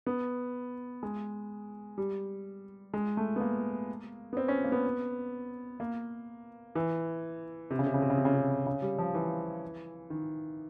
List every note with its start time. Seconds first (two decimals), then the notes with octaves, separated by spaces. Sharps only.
0.07 B3
1.03 G#3
1.98 G3
2.94 G#3
3.17 A3
3.36 B3
3.41 A#3
4.33 B3
4.37 C4
4.48 C#4
4.64 A#3
4.72 B3
5.80 A#3
6.75 E3
7.70 C3
7.79 C#3
7.86 C3
7.94 C#3
8.02 C3
8.10 C#3
8.18 C3
8.25 C#3
8.33 C3
8.67 C#3
8.82 G3
8.99 F3
9.14 E3
10.10 D#3